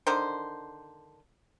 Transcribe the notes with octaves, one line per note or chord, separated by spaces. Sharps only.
D3 D#3 C5